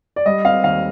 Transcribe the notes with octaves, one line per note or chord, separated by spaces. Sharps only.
D5
G3 D#5
C4 F5
D#2 F5